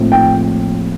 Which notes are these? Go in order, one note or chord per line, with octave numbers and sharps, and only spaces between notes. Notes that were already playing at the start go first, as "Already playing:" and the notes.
Already playing: A#1 A2 F3 A3 C4
G5